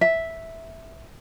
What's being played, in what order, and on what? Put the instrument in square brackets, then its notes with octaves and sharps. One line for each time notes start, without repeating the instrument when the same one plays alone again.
[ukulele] E5